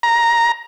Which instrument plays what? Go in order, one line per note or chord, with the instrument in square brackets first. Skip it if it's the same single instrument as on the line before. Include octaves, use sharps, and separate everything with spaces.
[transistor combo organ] A#5